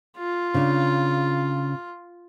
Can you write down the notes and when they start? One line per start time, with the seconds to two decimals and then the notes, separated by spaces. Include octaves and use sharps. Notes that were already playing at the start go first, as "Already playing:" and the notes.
0.17 F4
0.54 C#3 D4